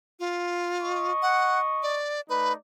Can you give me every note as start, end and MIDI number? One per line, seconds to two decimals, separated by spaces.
0.19 1.12 65
0.82 2.00 75
0.82 2.00 85
1.22 1.59 78
1.83 2.21 74
2.29 2.55 57
2.29 2.55 63
2.29 2.52 71
2.29 2.55 74